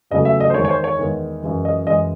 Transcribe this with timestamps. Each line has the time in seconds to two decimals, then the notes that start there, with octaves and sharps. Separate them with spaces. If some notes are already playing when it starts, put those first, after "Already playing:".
0.11 E2 C#3 F#3 A3 D#5
0.25 E5
0.40 D#5
0.50 C5
0.54 E2 D#3 G#3 C#5
0.65 C#5
0.70 C5
0.84 C#5
0.99 E2 D#3 G#3
1.42 F#2 E3 G#3
1.65 D#5
1.86 F#2 E3 G#3 D#5